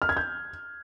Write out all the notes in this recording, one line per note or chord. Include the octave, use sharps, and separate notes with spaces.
F6
G#6
G6